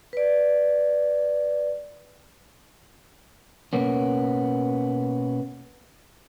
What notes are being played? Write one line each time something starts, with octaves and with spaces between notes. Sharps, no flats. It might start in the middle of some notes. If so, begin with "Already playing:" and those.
B4 D5
B2 A#3 B3 C#4